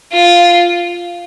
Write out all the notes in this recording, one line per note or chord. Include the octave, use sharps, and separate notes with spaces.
F4